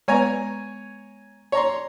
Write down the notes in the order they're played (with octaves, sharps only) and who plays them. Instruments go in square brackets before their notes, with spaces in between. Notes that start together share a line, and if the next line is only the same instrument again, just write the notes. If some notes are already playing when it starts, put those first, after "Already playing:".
[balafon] G#3 B3 B4 [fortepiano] C#5 G#5 A#5
[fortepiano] C#5 A#5 C6